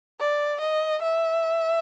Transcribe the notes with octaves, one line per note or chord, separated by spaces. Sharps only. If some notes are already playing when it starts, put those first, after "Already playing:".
D5
D#5
E5